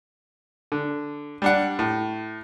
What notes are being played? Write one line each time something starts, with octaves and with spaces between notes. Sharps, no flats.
D3
G3 D4 F#5
A2